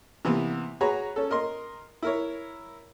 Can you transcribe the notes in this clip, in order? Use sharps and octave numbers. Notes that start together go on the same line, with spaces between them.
C3 E3 A#3 B3
F#4 G#4 B4 C#5 A#5
C#4 A4
A#4 D#5 C6
E4 A#4 C#5